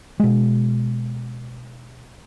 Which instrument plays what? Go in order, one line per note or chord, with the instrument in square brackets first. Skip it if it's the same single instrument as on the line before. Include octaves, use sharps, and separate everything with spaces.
[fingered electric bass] B2 G#3